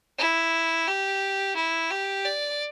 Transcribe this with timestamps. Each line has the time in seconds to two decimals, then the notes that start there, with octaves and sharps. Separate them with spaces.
0.18 E4
0.87 G4
1.56 E4
1.91 G4
2.25 D5